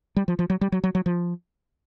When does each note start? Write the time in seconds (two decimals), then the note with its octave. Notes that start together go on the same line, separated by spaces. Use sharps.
0.16 G3
0.28 F3
0.39 F3
0.50 F#3
0.61 G3
0.72 F#3
0.84 F#3
0.95 F#3
1.06 F3